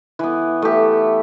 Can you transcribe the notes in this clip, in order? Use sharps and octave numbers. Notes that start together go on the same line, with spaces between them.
E3 B3
A3 G4